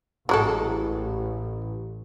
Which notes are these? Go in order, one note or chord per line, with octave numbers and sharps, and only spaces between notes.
A1 F#3 G#3 A4